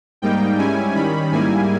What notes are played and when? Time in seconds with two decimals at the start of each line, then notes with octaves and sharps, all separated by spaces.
0.22 G#2 G3 A#3 D#4 G5
0.58 G#2 G3 C#4 E4 G#5
0.95 D#3 G3 C#4 B5
1.31 G#2 G3 A#3 E4 G#5